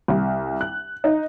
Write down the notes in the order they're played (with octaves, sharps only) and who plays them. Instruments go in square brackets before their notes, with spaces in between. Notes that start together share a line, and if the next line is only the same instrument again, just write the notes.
[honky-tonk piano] C2
F#6
D#4